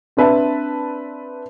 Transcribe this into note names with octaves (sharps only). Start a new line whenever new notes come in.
C4 D4 B4 E5 A5